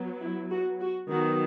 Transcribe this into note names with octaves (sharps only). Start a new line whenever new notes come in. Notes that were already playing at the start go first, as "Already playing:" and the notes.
Already playing: F#3 B3
E4
F#4
F#4
D#3 F#3 B3 F#4